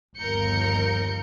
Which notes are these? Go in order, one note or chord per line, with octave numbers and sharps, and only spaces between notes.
G1 D#2 F3 A#4 G6 C#7